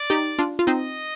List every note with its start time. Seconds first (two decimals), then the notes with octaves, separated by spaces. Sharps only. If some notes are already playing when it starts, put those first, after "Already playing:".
Already playing: D5
0.10 D#4 G4
0.39 D4 F4
0.59 F4
0.67 C4 D#4 D#5